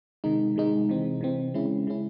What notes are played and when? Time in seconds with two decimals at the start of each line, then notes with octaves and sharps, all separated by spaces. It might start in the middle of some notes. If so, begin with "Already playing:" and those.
0.24 C3 D#3 G#3 D#4
0.56 C3 D#3 G#3 D#4
0.89 C3 E3 C4
1.21 C3 E3 C4
1.54 C#3 G#3 C#4 E4
1.87 C#3 G#3 C#4 E4